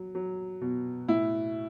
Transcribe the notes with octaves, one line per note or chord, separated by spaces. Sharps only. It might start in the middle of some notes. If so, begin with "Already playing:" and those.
Already playing: F#3
F#3
B2
A2 E4